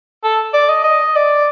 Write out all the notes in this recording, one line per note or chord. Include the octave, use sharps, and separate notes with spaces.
A4
D5
D#5
D#5
D5